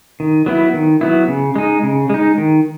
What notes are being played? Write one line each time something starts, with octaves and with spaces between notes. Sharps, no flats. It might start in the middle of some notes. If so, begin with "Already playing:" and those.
D#3
F#3 B3 E4
D#3
F#3 B3 E4
C#3
G#3 D#4
C#3
G#3 D#4
D#3